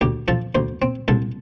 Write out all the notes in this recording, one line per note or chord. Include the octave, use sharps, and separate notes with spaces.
D2 G4
F3 A4
D2 C5
C4
C2 A4